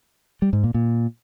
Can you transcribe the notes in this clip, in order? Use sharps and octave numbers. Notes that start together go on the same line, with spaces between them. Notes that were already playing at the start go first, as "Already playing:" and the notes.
G3
G#2
A#2
A#2